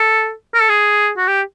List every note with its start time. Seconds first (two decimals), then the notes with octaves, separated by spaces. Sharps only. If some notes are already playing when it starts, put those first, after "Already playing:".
Already playing: A4
0.54 A#4
0.62 A4
0.69 G#4
1.17 F#4
1.28 G4